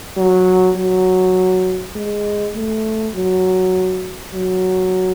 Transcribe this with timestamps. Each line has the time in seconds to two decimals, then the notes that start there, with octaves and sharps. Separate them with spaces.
0.17 F#3
0.76 F#3
1.95 G#3
2.55 A3
3.15 F#3
4.34 F#3